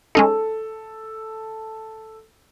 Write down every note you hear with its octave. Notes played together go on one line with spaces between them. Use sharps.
G#3 C#4 D#4 A4